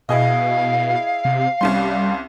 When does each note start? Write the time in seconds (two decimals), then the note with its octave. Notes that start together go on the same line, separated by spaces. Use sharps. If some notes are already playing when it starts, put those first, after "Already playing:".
0.09 B2 E4 G#4 D#5 F5
1.25 C3
1.61 C2 G3 C#4 C6